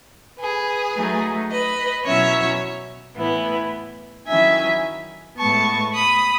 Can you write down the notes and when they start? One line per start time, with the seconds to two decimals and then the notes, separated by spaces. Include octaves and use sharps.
0.39 G#4 B4
0.96 F#3 A3 D#4
1.51 B4 D#5
2.05 B2 F#3 C#4 E4 C#5 E5
3.17 A2 E3 B3 E4
4.27 D#3 F#3 C#4 E4 E5 G#5
5.37 A2 G#3 B3 A5 C#6
5.94 B5 D#6